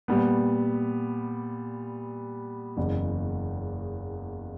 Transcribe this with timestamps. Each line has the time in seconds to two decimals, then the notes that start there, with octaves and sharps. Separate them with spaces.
0.08 A#2 G3 B3
2.77 F#1 E2 C#3